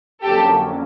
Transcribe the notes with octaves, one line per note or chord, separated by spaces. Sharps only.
F2 D3 F#3 A#3 C#4 G4 A4